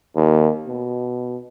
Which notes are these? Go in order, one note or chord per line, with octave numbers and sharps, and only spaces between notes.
D#2
B2